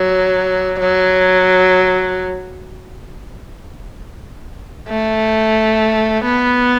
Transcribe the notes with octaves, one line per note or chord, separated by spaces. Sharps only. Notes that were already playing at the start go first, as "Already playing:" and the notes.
Already playing: F#3
F#3
A3
B3